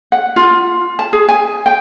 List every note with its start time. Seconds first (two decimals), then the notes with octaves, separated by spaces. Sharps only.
0.12 F#5
0.36 F4
0.99 A5
1.13 G#4
1.29 G#5
1.66 G5